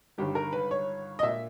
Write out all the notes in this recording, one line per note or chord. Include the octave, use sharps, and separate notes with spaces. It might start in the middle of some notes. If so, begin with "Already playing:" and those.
G1 G2 D#3 G4
A#4
B4
C#5
D#5
A#2 E5